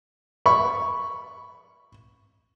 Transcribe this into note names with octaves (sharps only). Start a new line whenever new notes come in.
B5 C#6